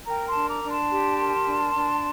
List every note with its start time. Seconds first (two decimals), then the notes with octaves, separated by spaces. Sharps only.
0.07 A#4 G5 A#5
0.28 A5 C6
0.35 D4
0.49 A#5 D6
0.64 D4
0.70 A5 C6
0.91 G4
1.19 A#4
1.47 D4
1.75 D4